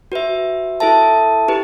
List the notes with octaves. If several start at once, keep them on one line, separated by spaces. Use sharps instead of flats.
F#4 B4 E5
E4 A4 E5 A5
E4 G4 B4